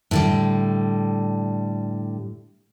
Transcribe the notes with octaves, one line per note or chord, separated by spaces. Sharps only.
A2 D3 G3